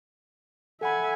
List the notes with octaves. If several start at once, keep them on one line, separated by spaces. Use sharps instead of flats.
A4 E5 F#5 G#5 B5